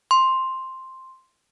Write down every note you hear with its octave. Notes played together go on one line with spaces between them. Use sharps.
C6